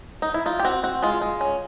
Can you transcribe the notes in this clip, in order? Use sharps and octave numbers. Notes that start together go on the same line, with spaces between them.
D#4
E4
D#4 F4
G4
C4 F#4
C4 F#4
G#3 F4
G#3
C#4